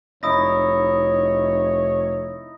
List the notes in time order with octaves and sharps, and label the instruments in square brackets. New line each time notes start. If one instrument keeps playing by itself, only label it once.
[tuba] F1 [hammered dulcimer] D#4 E4 [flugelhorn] C#5 [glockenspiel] D#6 A#6